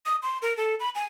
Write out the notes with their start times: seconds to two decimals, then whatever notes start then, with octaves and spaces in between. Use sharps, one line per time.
0.06 D#6
0.22 C6
0.42 A#4
0.57 A4
0.80 B5
0.95 G#5